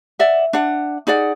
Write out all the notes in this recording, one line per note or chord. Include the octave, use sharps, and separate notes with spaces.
D5 E5 F#5
D4 F#5
D#4 G#4 D5 F#5